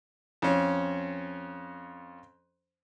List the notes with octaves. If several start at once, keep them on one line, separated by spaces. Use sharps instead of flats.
F2 C#4